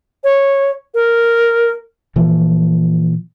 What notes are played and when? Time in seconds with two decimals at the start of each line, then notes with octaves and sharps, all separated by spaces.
0.24 C#5
0.94 A#4
2.16 A#2 E3 F3